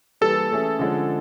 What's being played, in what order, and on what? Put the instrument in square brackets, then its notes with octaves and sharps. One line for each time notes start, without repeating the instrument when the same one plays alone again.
[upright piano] E3 G3 A#3 [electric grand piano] A4
[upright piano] E3 A3 C#4 E4 G#4
D3 F3 G#3 C#4